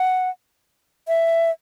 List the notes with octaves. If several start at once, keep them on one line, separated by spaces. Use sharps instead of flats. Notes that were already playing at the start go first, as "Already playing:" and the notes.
Already playing: F#5
E5